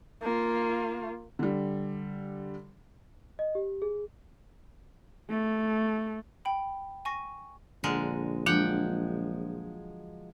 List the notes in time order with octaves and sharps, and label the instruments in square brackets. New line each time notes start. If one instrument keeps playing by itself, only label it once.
[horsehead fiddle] A#3 F4
[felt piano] D3 G3
[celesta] D#5
G4
G#4
[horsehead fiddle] A3
[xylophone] G5 B5
G#5 C#6 A#6
[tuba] A#1 [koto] D3 G#3 A#4
[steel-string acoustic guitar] F3 F#3 G#3 [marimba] D4 [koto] F#5 G5